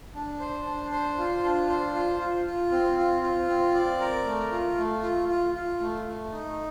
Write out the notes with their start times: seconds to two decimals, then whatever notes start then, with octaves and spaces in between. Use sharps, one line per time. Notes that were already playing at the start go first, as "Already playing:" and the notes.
0.15 D4
0.40 C5
0.65 D4
0.91 C5
1.18 F4
1.43 D4
1.69 C5
1.94 F4
2.19 F4
2.45 F4
2.71 C4
2.97 F4
3.22 F4
3.48 C4
3.74 D5
4.00 A#4
4.25 A3
4.51 F4
4.77 A3
5.02 F4
5.28 F4
5.54 F4
5.80 A3
6.06 A3
6.32 D#4